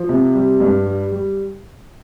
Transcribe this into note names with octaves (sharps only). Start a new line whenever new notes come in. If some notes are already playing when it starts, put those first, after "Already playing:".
Already playing: F3
C3
G3
G2
G3
G3